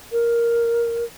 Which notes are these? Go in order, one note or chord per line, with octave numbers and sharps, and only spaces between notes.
A#4